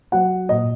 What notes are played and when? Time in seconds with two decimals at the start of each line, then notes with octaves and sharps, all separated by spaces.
0.12 F#3 F#5
0.49 A#2 D#5